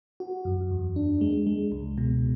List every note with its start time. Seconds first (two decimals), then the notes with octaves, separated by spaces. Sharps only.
0.20 F#4
0.45 F#2
0.71 E2
0.96 D4
1.21 G#3
1.47 G#3
1.72 C#2
1.98 B2